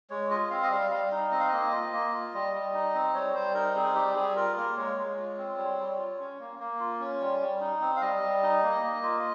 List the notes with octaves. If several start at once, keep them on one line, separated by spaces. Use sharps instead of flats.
G#3 C#5
F4 D#5
C4 F5
D#5
G3 F5
G3 F5
D#4
C4 D#5
F5
A#3 D#5
F4
A#3
F4
G3
G3
D#4
C4
G3 C#5
G3 C5
D#4 A#4
C4 G#4
G3 G4
G3 G#4
F4 A#4
A#3 A#4
G#3 C#5
G#3
F4
C4
G3
G3
F4
C#4
A#3
A#3
F4
C#4
G3
G3
D#4
C4
F5
G3 D#5
G3
D#4
A#3
A#3
F4